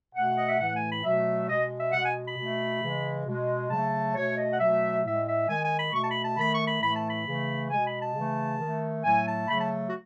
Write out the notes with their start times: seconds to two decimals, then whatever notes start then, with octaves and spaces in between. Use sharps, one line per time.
0.15 B2 A3 F#5
0.35 D#5
0.47 E5
0.59 A2 E3 A3 F#5
0.75 G#5
0.89 B5
1.04 B2 F#3 A3 E5
1.48 B2 G#3 D#5
1.78 E5
1.93 B2 G#3 F#5
2.04 G#5
2.26 B5
2.37 B2 A3
2.82 C#3 E3 G#3
3.26 B2 G#3
3.71 C#3 F#3 A3 A5
4.15 B2 A3 C#5
4.37 D#5
4.52 F#5
4.60 B2 F#3 A3 E5
5.04 A2 G#3 E5
5.26 E5
5.48 D#3 G#3 G#5
5.63 G#5
5.78 B5
5.93 B2 A3 C#6
6.02 A5
6.08 B5
6.23 A5
6.37 D#3 A3 B5
6.52 C#6
6.67 B5
6.81 A2 E3 A3 B5
6.94 A5
7.06 B5
7.26 C#3 E3 A3
7.70 B2 G#3 G#5
7.85 B5
8.00 A5
8.15 C#3 E3 A3
8.59 D#3 A3
9.03 A2 F#3 A3 G#5
9.26 A5
9.47 C#3 F#3 A3 B5
9.59 A5
9.85 F#4